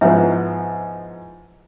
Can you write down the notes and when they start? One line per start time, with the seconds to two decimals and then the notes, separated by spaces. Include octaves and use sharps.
0.01 G#2 F3 B3 E4 E5